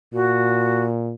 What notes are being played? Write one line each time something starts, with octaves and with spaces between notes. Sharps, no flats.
A#2 F#4